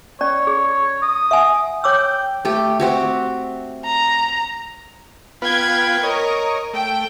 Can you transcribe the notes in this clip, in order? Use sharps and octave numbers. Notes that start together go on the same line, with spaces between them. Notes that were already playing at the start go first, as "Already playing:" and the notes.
C#4 C#5 D5
G#4
D#6
E5 F#5 G#5
C#5 G5 D6 E6
A3 G4
C4 F#4 G4
A#5
B3 F4 B4 G5 G#6
A#4 C#5 D#5
A3 G5